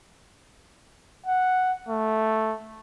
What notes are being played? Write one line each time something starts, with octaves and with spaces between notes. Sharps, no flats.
F#5
A3